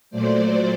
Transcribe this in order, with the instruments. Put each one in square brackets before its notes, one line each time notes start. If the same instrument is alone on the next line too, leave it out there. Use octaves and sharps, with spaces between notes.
[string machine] A#2 F#3 A3 C5 D5